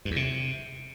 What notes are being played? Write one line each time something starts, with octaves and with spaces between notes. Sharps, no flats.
G2
E2
C3